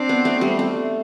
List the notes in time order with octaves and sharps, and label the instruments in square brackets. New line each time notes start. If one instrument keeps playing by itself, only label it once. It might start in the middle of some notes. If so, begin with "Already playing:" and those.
Already playing: [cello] C4 [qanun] D4
[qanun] B3
A3
G3
A3